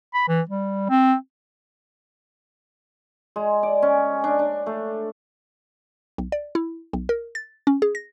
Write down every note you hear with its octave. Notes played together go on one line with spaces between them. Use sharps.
B5
E3
G3
C4
G#3
D5
C#4
D4
D4
A3
B1
D5
E4
B1
A#4
A6
C#4
G#4
A#6